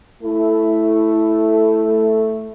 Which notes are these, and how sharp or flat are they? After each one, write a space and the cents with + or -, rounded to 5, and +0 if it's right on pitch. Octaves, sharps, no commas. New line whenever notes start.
A3 +0 E4 +0